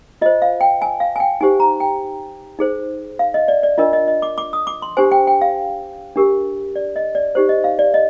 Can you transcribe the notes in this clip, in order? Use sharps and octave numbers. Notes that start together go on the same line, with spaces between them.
F4 C5 D#5
F5
G5
G#5
F5
G#5
G5
D#4 G4 C5 G#5
A#5
G5
D#4 G#4 C5
F5
D#5
D5
D5
D4 F4 A#4 D#5
D#5
D#5
D6
D6
D#6
D6
C6
D4 G4 C5 G#5
G5
G5
F5
D4 G4 A#4
D5
D#5
D5
D#4 G4 C5
D#5
F5
D5
D#5